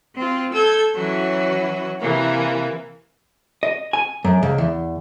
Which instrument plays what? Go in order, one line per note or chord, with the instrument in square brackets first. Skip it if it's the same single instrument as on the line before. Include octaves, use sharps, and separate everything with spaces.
[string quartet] C4 F4
A4 E6 G6 G#6
E3 F#3 C#4 F#4
C3 E3 A#3
[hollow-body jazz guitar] D#5
G#5
F#2
C#2
E2